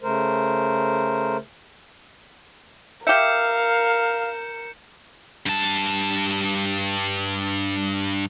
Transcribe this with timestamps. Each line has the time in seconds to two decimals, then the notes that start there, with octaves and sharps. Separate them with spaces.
0.01 C#3 A3 A#4 C5
3.07 G4 A#4 E5 F5 G6 C#7 E7
5.46 G2 A5